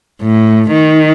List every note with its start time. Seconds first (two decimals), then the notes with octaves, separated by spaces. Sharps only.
0.22 A2
0.72 D#3